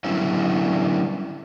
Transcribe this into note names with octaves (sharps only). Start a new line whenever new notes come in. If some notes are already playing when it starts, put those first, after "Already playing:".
D3 F#3 G3 B3 C#4 E4